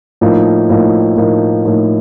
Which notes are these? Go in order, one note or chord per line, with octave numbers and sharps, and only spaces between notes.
A2 F3 A#3 D#4
A2 F3 A#3 D#4
A2 F3 A#3 D#4
A2 F3 A#3 D#4